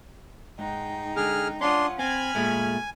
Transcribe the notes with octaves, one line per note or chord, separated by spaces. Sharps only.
G#2 G#3 D#4 G5
D3 G#4 F6
C#4 D4 F4 F#5 C6 D#6
C4 G#5 B5 F6 G#6
A#2 G#3 A3